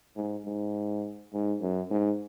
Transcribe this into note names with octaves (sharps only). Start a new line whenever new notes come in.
G#2
G#2
G#2
F#2
G#2